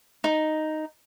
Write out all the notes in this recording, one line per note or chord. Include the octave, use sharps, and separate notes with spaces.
D#4